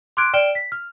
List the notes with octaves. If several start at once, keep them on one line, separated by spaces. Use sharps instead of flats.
C6 D6 F6 F#6 G#6 D7
D5 G5 F6 D7 E7 G7
B6
F6